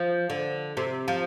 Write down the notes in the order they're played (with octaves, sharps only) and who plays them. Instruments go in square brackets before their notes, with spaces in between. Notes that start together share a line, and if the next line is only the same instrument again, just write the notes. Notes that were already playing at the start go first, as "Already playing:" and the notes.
Already playing: [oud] F3
D3
C3
F3